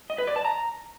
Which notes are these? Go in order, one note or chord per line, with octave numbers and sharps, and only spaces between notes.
D#5
B4
D5
A5
A#5